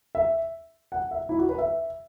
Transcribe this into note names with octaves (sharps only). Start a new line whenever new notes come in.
E5
F#5
E5
E4
F#4
B4
E5